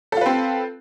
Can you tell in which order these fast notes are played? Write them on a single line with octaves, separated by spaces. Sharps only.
A4 F4 B4 C4